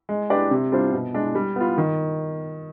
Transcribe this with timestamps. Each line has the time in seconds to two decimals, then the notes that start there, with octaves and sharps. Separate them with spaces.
0.09 G#3
0.30 D4 G4 B4 D5
0.51 C3
0.72 G3 D4 F4 C5
0.93 B2
1.14 G#3 D4
1.35 G3
1.56 B3 F4
1.78 D#3